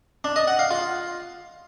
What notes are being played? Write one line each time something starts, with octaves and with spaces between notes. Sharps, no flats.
D4
D#5
F#5
F5
F4